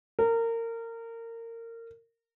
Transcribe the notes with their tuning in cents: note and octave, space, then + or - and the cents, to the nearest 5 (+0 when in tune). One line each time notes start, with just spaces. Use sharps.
A#4 -25